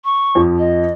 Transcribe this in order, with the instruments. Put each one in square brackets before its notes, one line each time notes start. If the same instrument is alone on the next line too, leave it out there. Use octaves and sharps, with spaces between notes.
[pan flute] C#6
[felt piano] F2 F3
[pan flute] D#5